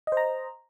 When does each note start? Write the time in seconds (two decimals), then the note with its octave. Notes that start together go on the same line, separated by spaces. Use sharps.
0.07 D#5
0.12 C5
0.17 A#5